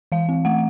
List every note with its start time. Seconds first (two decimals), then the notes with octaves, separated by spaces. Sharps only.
0.12 E3 F5
0.29 C4
0.45 A3 F#5